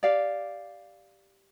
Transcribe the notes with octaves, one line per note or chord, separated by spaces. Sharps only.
G4 D5 F5